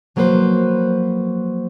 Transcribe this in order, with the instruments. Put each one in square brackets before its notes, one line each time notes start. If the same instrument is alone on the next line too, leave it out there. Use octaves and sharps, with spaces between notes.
[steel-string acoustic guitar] F3 F#3 A#3 A4 B4 C5